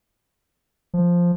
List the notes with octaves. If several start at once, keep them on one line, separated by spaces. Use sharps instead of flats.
F3